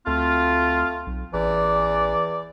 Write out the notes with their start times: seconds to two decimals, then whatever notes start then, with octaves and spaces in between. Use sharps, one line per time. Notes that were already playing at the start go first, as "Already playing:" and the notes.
0.07 D2 A3 C4 F4
1.06 B1
1.34 A1 E2 E3 D5